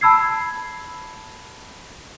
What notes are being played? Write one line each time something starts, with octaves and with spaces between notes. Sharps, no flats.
A5 B5 E6 G#6 C7